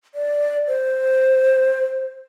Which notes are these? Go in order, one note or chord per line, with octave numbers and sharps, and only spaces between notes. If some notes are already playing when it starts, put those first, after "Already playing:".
D5
C5